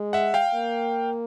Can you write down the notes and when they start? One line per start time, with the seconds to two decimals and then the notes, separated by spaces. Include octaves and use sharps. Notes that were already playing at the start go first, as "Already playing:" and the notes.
Already playing: G#3
0.13 E5 F#5
0.34 F5 G5
0.54 A#3